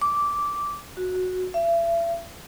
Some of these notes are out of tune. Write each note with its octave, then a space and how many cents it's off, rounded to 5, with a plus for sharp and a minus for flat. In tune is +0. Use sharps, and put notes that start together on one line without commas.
D6 -10
F#4 -10
E5 +40